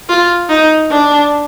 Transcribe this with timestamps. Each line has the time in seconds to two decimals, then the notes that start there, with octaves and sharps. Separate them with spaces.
0.09 F4
0.49 D#4
0.90 D4